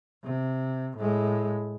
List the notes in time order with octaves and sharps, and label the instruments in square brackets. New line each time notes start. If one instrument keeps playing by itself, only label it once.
[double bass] C3
A2 G#3